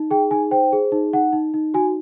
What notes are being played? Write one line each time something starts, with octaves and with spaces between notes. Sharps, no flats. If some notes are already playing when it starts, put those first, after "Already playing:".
Already playing: D#4
G#4 G5
D#4 G#5
C5 G5
G#4
D#4
D#4 F#5
D#4
D#4
F#4 G#5